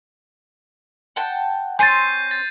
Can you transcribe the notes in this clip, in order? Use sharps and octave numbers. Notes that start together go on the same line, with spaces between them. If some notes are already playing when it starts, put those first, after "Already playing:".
F#5 G5 A5
C4 C5 C#5 G#5 G6 A6 C7 D#7
A6